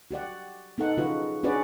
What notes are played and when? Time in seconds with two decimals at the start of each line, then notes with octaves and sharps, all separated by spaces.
0.11 F#4 G4 D5 F#5
0.78 B3 D#4 A4 F#5
0.97 C#3 F4 F#4 B4
1.43 C#4 D4 F#4 G#4 B4 D5